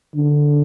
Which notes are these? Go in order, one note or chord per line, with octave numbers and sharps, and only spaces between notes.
D3